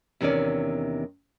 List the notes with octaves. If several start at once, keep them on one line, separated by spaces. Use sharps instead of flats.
E2 C3 D#3 A3 C#4 D5